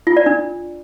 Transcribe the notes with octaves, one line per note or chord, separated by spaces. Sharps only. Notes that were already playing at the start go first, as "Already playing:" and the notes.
F4
D5
D4